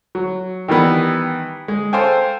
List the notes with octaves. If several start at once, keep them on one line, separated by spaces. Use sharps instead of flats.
F#3
D#3 E3 G3 B3
G#3
A4 C5 F5 G5 G#5